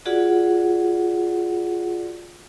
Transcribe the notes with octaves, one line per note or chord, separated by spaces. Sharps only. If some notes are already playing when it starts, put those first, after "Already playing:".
F4 F#4 G#4 D5 F#5